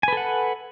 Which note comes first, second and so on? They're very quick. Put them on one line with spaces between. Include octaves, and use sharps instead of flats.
G#5 B4 A4 F#5